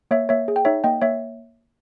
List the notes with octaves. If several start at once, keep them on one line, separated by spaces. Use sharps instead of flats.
A#3 C#5 E5
A#3 C#5 E5
G#4
G5
D#4 C#5 E5
A#3 D#5 G5
A#3 C#5 E5